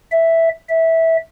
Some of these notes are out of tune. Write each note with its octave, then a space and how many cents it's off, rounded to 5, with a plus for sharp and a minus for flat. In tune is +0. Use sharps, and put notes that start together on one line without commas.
E5 +0
E5 -15